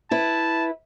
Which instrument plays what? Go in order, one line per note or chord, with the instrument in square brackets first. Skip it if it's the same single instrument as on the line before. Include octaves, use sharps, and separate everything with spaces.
[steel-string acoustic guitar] E4 B4 [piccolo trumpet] A5